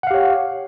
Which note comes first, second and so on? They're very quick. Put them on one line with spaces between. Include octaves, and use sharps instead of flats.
F#5 F5 G4 C#5